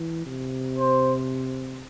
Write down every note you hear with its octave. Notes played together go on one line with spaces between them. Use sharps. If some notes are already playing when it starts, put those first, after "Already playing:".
Already playing: E3
C3
C5